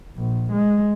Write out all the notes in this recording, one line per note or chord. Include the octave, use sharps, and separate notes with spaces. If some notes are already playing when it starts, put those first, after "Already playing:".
A#1
G#3